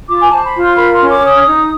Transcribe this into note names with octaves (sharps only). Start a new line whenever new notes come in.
F4 D6
G#5
C5 A5
B5
F4
C6
A#4 B5
C6
C#4
D6
C#5 D#6
D#4